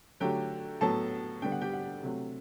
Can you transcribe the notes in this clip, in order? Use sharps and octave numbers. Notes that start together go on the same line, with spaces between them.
D3 F#3 A3 G4 G5
A2 F#3 B3 A4 A5
D3 G3 B3 G5
F#5
G4 G5
F#5
C3 F#3 A3